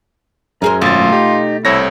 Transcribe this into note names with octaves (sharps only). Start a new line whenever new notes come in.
F#2 F#3 C#4 G#4 A#4 C5
G#1 B2 A3 F4 A6
D#4 G4
C2 C4 E4 A4 C#5 A#6